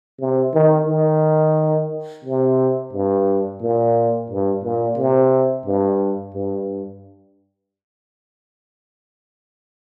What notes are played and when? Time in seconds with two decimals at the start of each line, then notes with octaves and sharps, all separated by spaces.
0.20 C3
0.54 D#3
0.88 D#3
2.25 C3
2.93 G2
3.62 A#2
4.30 G2
4.64 A#2
4.98 C3
5.66 G2
6.35 G2